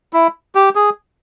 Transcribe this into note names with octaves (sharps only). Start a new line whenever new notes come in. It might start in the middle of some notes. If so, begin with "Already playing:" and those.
E4
G4
G#4